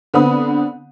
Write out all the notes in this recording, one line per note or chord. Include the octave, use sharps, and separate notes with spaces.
D3 B3 C4 B5 D#6